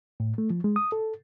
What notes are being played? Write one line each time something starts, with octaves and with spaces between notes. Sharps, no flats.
A2
A3
F3
G#3
D#6
A4